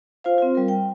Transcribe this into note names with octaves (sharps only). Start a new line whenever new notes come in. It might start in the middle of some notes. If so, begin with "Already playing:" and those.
F4 C5 F5
C4 F4
G3 A#4
G5